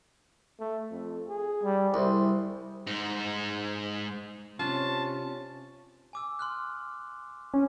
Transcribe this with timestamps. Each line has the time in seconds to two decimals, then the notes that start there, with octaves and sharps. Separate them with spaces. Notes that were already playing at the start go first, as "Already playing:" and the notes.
0.60 A3
0.91 F2
1.29 G#4
1.63 G3
1.94 C2 E4 C5
2.87 G#2 D#4
4.59 C3 C#4 D4 F4 A5
6.13 G#5 D6 E6
6.39 C6 F6 F#6
7.54 C#4